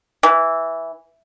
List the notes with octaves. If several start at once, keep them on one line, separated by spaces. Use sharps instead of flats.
E3